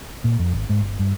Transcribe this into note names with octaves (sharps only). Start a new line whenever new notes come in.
A#2
F2
G#1
G#2
G1
G2